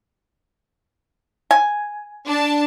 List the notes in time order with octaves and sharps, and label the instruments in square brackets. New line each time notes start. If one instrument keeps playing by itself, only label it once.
[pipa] G#5
[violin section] D4 A5